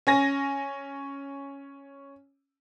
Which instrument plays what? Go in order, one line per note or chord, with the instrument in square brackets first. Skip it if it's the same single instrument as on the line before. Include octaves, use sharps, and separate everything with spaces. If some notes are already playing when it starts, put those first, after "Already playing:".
[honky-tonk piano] C#4 G#5 A#6